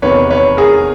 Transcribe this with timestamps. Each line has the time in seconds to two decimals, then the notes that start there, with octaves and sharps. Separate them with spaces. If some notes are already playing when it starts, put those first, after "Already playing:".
0.02 E2 C3 D#3 B4 C#5
0.30 B4 C#5
0.57 G#4 A#4